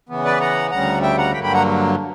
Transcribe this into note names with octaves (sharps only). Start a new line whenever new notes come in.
C#3 E3 B3
B4 D5
F#5 A#5
D2 C#3 G3 F#5 A#5
E5 G5
F#5 A#5
G2 D3 F#3 A#3 G5 B5
G5 B5
F#5 A#5